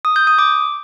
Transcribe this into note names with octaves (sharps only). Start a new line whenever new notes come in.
D#6
G6
D#6
D6